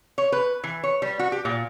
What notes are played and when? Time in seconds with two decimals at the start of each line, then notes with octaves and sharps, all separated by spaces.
0.18 C#5
0.32 B4
0.64 E3
0.83 C#5
1.02 G3
1.19 F#4
1.32 G4
1.45 A#2